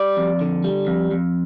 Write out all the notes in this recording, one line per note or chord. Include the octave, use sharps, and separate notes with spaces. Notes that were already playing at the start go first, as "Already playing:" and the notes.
Already playing: G3 D5
F2
D3
G3
F2
F2